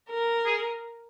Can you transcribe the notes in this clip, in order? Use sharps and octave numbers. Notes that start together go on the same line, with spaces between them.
A#4
G#4